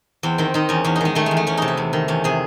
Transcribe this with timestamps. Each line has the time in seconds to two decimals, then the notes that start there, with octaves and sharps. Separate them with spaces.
0.23 E2 C4
0.38 D#3 C4
0.54 D#3 D#4
0.69 E2 C#4
0.84 E2 C#4
0.96 D#4
1.01 D#3 G#3
1.15 D#3 A3
1.26 E2 G#3
1.37 A3
1.47 E2 C#4
1.57 C3 D#4
1.68 E4
1.77 E2
1.93 D#3
2.08 E2 C#4
2.24 C3 G#4